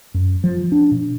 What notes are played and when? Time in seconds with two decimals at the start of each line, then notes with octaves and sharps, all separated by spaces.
0.14 F#2
0.44 F3
0.72 D4
0.91 B2